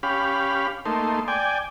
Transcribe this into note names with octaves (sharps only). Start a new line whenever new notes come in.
C#4 G4 F5 B5
A3 A#3 D#4 C6
D5 G5 G#5